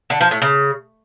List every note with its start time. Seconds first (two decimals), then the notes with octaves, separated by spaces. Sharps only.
0.10 D3
0.21 F3
0.31 A2
0.42 C#3